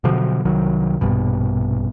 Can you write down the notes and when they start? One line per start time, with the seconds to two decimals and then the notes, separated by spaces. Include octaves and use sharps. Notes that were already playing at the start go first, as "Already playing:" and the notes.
0.04 B2 D3 F3 F#3
0.45 C2 D#3 F#3
1.01 A#1 G2 B2